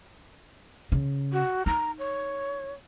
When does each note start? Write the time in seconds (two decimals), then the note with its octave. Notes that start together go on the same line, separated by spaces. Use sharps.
0.92 C#3
1.33 F#4
1.66 D#4 A#5
1.99 C#5